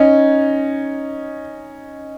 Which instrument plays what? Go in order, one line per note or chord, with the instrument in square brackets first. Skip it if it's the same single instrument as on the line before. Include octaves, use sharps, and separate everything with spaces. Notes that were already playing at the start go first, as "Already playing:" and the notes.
Already playing: [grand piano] C#4 D#4